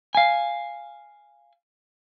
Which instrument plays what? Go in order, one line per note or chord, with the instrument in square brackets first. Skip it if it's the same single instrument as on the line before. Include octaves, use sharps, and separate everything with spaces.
[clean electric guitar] F5 G#5